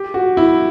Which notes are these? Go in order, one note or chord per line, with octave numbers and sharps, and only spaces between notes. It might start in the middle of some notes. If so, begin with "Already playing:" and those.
Already playing: G4
F#4
E4